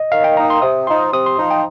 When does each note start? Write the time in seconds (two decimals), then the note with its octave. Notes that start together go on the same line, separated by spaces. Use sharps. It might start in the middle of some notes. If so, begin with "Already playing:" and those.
Already playing: D#5
0.12 D#3 F5
0.24 G5
0.37 A#3 D#4 A#5
0.50 C6
0.62 C3 D#6
0.87 F3 D#4 C6
1.13 C3 D#6
1.26 C6
1.38 F3 D#4
1.50 G5